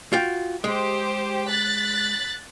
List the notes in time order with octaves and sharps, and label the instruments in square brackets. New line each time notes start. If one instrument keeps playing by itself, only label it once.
[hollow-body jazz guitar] F4 F#4 G5
[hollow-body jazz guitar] G#3 [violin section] G4 C5
[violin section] F#6 A6 B6